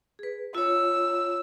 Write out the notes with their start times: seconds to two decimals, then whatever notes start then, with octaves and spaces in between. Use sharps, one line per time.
0.19 G#4 B4
0.55 F4 C#5 E6